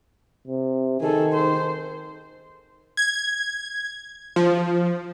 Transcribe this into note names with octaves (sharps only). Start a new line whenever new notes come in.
C3
D#3 G#4 A4
C5
G#6
F3